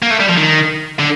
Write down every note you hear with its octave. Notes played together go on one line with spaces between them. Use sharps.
A#3
A3
G3
F3
D#3
D3